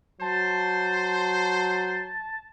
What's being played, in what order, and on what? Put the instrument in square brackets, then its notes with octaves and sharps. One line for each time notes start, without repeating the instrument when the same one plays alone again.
[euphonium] F#3 [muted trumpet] C5 [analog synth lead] A5